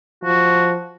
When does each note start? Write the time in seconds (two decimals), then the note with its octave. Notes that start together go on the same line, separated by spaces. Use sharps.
0.23 F3 F#4